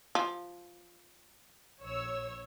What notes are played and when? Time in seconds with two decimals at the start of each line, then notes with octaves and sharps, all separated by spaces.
0.15 F3
1.81 A#1 C#5 E6